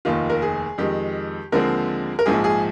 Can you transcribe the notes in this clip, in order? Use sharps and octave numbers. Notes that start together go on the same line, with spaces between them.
F1 D#2 D#3 F4
A#4
G#4
F2 D#3 G#3 G4
D#2 D3 F3 G#3 C4 A#4
A#4
A#1 G#2 F3 G#4
G#4